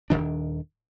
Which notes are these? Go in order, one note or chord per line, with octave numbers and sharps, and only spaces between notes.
D#1 D#2 D#3 D4